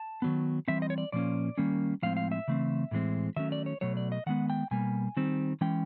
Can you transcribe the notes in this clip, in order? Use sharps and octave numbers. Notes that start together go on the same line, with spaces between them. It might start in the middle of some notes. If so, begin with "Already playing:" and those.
Already playing: A5
D#3 F#3 B3
E3 G3 C4 E5
D#5
C#5
D5
A#2 F3 A#3 C#4 D5
D#3 G3 A#3 C#4
A2 F3 G#3 C4 F5
F5
E5
C#3 E3 A3 C4
A2 E3 G#3 C4
D#3 F#3 A3 C#4 E5
D5
C#5
B2 F#3 A3 C#5
D5
D#5
D#3 G#3 B3 F#5
G5
B2 G3 A#3 G#5
D#3 G3 C4
E3 G#3 C#4 G5